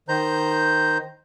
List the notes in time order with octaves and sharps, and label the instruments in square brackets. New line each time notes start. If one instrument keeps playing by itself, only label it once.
[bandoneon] D#3 C5 A#5 G6